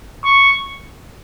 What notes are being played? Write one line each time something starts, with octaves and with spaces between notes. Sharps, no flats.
C#6